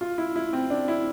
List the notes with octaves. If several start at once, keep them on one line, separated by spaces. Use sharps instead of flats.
F4
E4
E4
C4
D4
E4